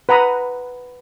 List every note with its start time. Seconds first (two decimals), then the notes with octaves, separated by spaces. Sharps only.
0.09 B4 F#5 A#5 B5 D#6